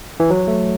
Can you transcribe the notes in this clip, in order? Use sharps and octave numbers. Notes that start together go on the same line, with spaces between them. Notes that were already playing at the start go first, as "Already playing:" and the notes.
E3
F#3
A3